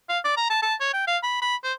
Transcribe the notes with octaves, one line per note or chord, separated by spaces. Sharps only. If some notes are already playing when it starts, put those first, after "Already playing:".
F5
D5
A#5
A5
A5
C#5
G5
F5
B5
B5
C5